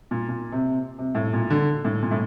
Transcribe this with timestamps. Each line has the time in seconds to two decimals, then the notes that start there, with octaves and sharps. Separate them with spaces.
0.11 A#2
0.29 A#2
0.52 C3
0.98 C3
1.15 A2
1.33 A#2
1.50 D3
1.85 A2
2.02 A#2
2.11 A2